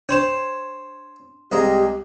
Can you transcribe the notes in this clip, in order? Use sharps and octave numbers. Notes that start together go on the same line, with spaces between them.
D4 C5 C#5 C6 E7
C2 G#3 G4 A#5